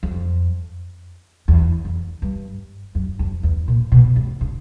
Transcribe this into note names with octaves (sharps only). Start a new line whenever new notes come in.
F2
E2
F2
G2
F#2
F2
E2
A#2
B2
A2
D3